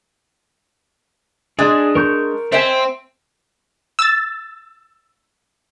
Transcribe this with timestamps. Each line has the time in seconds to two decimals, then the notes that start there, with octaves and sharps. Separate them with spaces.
1.59 G#3 D4 G#4 D#6
1.95 A#4 C#6 G6
2.52 C4 C5 E5 G#5
3.99 E6 A6